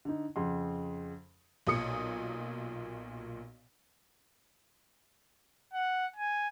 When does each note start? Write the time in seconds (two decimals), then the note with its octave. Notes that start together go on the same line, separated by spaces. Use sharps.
0.05 D3 D#4
0.36 F2 C#3 F#5 C6
1.67 B1 A#2 D#6 C#7
5.73 F#5
6.16 G#5